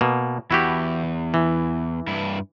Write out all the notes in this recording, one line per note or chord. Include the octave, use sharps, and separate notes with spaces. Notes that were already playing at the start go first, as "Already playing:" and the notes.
B2 A#3
E2 E4 F#4 G4
E3
G2 E4